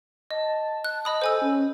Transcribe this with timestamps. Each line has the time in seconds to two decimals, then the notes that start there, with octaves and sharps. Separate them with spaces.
0.31 D#5 A5
0.84 F#6
1.05 D#5 B5 D#6
1.22 A4 C5 G#5 E6
1.42 C#4